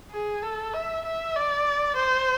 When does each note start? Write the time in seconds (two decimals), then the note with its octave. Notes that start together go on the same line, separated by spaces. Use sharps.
0.11 G#4
0.43 A4
0.74 E5
1.05 E5
1.36 D5
1.96 C5